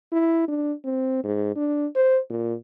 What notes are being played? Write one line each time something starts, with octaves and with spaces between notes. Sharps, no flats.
E4
D4
C4
G#2
D4
C5
A#2